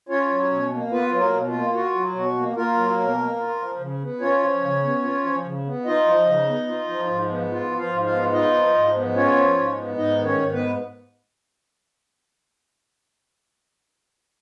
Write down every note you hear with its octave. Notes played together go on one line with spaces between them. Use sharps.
C#4 F4 C#5
F#3
B2
A#3
B3 F4 B4
F#3
A#3 A#4
B2
F4
A#3
F4 F#4
F#3
B2 F#4
A#3
A#3 F4 A#4
F#3
B2
A#3
F4
F3
C#3
B3
C#4 F4 C#5
F3
C#3
B3
F4
F3
C#3
B3
D#4 F4 D#5
F3
C#3
B3
F4
F3
G#2
B3
F4
F3
F4 F5
G#2
F4 F5
B3
D#4 F4 D#5
F3
G#2
B3
C#4 F4 C#5
F3
G#2
B3
G#2 D#4 D#5
D#3
C#4 C#5
G#2
B3 B4